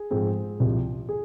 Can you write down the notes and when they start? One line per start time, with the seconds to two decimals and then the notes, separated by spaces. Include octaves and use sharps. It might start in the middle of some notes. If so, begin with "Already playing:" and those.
Already playing: G#4
0.11 G#2 F3 G#3 C4
0.60 C2 C3 F3
1.09 G#4